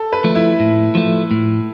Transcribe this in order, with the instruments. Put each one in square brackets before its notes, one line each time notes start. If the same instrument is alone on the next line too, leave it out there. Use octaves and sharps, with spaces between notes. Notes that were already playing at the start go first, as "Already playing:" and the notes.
Already playing: [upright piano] A4
B4
[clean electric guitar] F3 A3
[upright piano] E4
[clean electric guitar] A2
F3 A3
A2